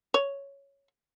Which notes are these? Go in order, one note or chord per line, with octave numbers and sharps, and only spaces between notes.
C#5